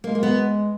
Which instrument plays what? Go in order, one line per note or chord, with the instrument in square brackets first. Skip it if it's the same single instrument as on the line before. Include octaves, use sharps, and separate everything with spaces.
[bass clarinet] G#3 [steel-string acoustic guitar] A#3
[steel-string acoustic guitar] A#3
B3